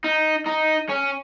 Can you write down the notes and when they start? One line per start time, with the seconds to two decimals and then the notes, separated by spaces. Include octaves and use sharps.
0.04 D#4
0.47 D#4
0.89 C#4